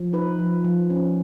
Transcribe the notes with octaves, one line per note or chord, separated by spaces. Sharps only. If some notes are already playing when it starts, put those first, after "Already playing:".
Already playing: F3
D#4 B4
F3
F3
C#4